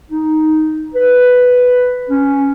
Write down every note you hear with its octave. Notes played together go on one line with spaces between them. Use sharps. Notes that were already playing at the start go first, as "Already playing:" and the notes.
D#4
B4
C#4